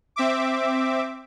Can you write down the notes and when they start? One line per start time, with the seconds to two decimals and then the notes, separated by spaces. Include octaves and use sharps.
0.16 C4 E5 D6